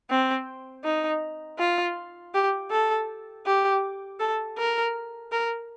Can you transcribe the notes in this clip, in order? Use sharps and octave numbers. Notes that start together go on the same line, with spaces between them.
C4
D#4
F4
G4
A4
G4
A4
A#4
A#4